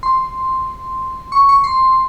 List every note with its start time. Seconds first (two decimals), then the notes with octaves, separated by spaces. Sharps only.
0.03 C6
1.32 C#6
1.49 C#6
1.64 C6